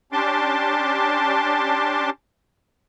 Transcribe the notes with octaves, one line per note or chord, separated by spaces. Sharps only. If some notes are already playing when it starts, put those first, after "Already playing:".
C#4 D4 G4 A5 C6 D6